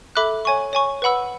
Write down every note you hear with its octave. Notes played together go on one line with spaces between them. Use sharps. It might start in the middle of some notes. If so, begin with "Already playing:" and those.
A4 E5 B5 D6 F#6
C#5 G#5 C#6
C#5 G#5 C#6
B4 F#5 B5 E6